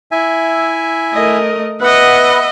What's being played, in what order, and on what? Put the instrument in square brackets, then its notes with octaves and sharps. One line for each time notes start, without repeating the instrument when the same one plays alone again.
[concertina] E4 E5 G#5
[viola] A3 [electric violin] A#4 D#5
[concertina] B3 B4 [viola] D#5 E5 [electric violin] F#5